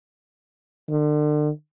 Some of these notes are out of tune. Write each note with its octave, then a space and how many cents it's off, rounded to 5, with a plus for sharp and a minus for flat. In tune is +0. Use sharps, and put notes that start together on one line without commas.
D3 +35